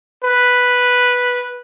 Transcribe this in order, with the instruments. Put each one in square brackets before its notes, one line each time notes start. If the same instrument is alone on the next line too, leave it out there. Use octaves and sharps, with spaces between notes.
[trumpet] B4